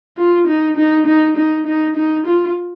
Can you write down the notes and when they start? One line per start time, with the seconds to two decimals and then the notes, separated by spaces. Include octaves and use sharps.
0.17 F4
0.47 D#4
0.77 D#4
1.06 D#4
1.37 D#4
1.66 D#4
1.96 D#4
2.27 F4